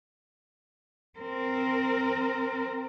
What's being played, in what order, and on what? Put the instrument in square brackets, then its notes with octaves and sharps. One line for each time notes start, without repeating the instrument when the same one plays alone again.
[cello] C4 A#4